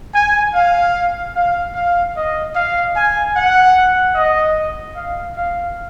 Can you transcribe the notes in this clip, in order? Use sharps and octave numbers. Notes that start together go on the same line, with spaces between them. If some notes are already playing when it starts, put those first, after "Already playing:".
G#5
F5
F5
F5
D#5
F5
G#5
F#5
D#5
F5
F5